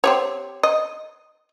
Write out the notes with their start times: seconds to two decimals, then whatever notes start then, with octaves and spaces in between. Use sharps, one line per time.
0.04 C4 G4 C#5
0.63 D#5